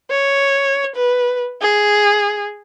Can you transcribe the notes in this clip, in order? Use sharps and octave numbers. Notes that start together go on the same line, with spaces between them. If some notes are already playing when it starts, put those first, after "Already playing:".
C#5
B4
G#4